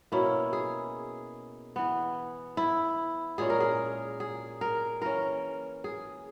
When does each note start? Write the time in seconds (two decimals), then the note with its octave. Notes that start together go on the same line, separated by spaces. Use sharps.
0.12 B2 A#3 C#4 E4
0.53 G#4
1.76 E3 B3
2.57 E4
3.38 A#2 G#3 C#4 G#4
3.50 A#4
3.60 G#4
4.20 G#4
4.61 A#4
5.01 E3 A#3 C#4 A#4
5.84 G#4